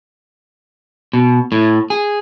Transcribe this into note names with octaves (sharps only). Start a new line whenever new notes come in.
B2
A2
G#4